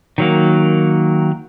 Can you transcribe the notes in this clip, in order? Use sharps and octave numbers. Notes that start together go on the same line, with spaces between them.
D#3 F#3 A#3